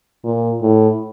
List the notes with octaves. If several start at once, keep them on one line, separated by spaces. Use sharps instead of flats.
A#2
A2